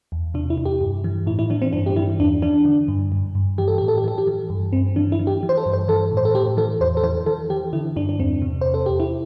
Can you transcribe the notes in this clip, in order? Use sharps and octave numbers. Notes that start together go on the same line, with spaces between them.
E2
C3 D4
E4
E2
G4
G2
E3
A2 E4
E4
E3 D4
C4
G2 D4
G4
E3 E4
E2 D4
E3 D4
D3
G2
G2
G2
E3 G4
A4
A2 G4
A4
G4
E3 A4
G4
E3
G2
G2 C4
E3 D4
E4
E3
G4
E3
C5
A4
G2
C5
E3 A4
A2
C5
A4
A2 G4
E3 A4
E2 C5
A4
E3 C5
E3 A4
E3 G4
D3 E4
G2 D4
D4
E2 C4
C3
E2 C5
A4
E2 G4
E4